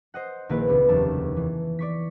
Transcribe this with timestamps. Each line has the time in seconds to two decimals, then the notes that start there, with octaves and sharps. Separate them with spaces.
0.14 C5 D#5 F#5
0.49 A#1 D#3 A#3 E4 B4
0.68 C#2 B3
0.89 F1 D#2 A5
1.36 E3
1.79 D5 C#6 B6